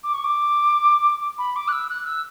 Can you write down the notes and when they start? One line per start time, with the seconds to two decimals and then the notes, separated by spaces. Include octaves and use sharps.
0.04 D6
0.14 C#6
0.24 D6
1.38 B5
1.56 D6
1.68 F#6
1.73 E6
1.90 F#6
2.06 E6